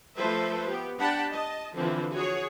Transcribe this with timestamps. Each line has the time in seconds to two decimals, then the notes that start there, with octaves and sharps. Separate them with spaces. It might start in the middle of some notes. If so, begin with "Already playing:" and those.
0.18 F3 A3 A4 B4 C5 E5
0.69 B3 G4
0.99 D4 G4 F#5 G5 A5 B5
1.31 D#5 A5
1.75 D3 E3 F3 C4 E4
2.13 F#4 G#4 C#5